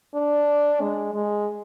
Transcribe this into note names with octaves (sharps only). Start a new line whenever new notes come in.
D4
G#3
G#3